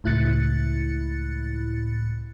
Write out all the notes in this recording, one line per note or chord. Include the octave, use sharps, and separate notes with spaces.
C#2 A2 E4 F#6 A6 C#7